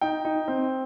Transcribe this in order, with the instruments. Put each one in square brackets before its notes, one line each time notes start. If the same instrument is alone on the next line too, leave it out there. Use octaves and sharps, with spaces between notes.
[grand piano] D#4 G5
D#4
C4